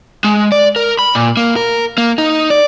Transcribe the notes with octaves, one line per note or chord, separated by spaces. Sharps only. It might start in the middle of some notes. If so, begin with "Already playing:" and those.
G#3
D5
A#4
B5
A#2
A#3
A#4
A#3
D#4
D5